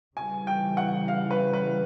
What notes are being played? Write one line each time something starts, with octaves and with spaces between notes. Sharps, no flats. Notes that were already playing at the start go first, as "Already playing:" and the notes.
C#3 E3 G3 G#5
G5
F#5
F5
B4
B4